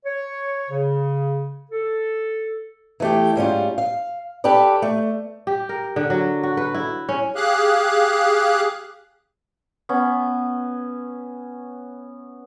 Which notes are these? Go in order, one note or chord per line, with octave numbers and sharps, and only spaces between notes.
C#5
C#3
A4
E3 A3 G4
G#2 G3 C#4 F4
F5
G4 A4 B4 D5
A3
G4
A#4
D3
F#3
F#4
B4
E4
C#4
G4 G#4 F5 F#6
B3 C#4